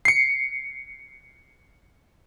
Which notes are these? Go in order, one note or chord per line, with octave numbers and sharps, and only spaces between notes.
C7 C#7